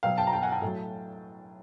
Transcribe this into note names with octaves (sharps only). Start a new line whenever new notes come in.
B2 F#3 F5 G5
G5 A5
A#5
G5 A5
F#5 G#5
G5 A5
A2 F#3